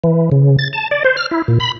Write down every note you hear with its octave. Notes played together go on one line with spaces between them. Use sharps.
E3
C#3
A6
A5
D5
C5
F6
E4
A#2
B5